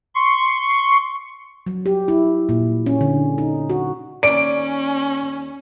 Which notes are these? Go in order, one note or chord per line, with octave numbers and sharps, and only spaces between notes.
C6 C#6
F#3
G4
E4
A#2
C#4
D3
D#4
F#4
D#2 C#4 D5 D7